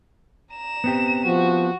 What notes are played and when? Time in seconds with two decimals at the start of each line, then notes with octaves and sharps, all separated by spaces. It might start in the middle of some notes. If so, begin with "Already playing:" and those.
0.54 A#5 E7
0.84 B3 C4 G4
1.26 F3 F#4